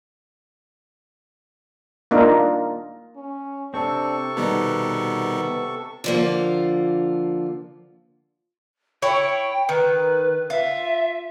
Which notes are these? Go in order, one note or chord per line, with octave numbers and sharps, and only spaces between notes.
A#3 D4 D#4 F4 A#4
C#4
C3 C4 D4 A4 C#6
B2 D#3 G3 B3 D#4
D3 F3 A#3
E4 C#5 G5
D#3 B4
F4 E5